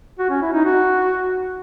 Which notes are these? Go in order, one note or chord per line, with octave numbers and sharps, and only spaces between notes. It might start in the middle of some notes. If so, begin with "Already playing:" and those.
F#4
C#4
E4
D#4
F#4